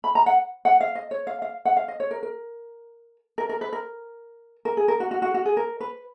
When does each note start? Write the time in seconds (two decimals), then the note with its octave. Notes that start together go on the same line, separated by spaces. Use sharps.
0.04 B5
0.15 A#5
0.26 F#5
0.65 F#5
0.81 F5
0.95 D#5
1.11 C#5
1.27 F5
1.42 F5
1.65 F#5
1.77 F5
1.88 D#5
2.00 C#5
2.11 A#4
2.23 A#4
3.38 A#4
3.49 A#4
3.61 B4
3.73 A#4
4.65 A#4
4.77 G#4
4.88 A#4
5.00 F#4
5.11 F#4
5.22 F#4
5.34 F#4
5.46 G#4
5.57 A#4
5.80 B4